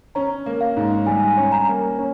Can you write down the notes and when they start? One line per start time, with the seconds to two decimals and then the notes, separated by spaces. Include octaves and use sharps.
0.15 C#4 A#5
0.46 A#3
0.61 F5
0.77 G#2
1.07 G3 G#5
1.37 C#4
1.52 A#5
1.68 A#3
1.99 C#4